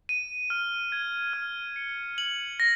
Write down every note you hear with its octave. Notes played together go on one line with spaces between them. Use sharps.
D#7
F6
G#6
F6
C#7
F#7
A#6